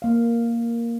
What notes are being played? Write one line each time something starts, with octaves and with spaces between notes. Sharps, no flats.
A#3 F5